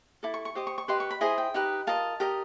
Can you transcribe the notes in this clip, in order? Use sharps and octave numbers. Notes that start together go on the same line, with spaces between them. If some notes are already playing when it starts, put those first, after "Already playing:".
E4 A4 D6
C#6
C#6
G4 C5 D#5 D6
C#6
C#6
G4 B4 D#5 C6
C#6
B5
E4 G#4 C5 D#5 G#5
G5
D#4 G4 B4 D#5
F4 A#4 D#5 A5
G4 A#4 D#5